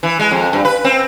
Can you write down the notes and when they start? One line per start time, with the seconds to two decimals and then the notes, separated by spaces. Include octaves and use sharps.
0.03 E3
0.20 G#3
0.31 F2
0.53 G2
0.65 B4
0.84 C4